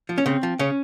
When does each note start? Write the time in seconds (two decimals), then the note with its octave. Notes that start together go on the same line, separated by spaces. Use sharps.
0.09 F3
0.18 C#4
0.26 C#3 C4
0.43 F3
0.59 C#3 C#4